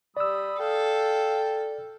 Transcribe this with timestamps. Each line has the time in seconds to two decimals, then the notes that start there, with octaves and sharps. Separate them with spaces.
0.17 G3 D5 B5 D#6 E6
0.59 A4 F5 G5